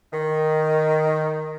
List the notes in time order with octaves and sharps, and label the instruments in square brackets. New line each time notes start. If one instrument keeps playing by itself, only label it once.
[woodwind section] D#3